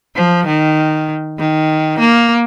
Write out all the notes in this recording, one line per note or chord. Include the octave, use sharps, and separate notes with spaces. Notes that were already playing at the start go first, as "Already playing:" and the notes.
F3
D#3
D#3
A#3